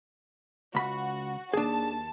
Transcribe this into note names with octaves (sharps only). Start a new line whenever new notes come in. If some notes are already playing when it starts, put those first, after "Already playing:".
C#2 F#4 B5
D#2 D4 G#4 A5